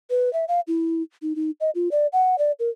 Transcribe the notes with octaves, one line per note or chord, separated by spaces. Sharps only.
B4
E5
F5
E4
D#4
D#4
D#5
F4
D5
F#5
D5
A#4